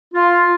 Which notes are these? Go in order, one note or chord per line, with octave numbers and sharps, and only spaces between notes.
F4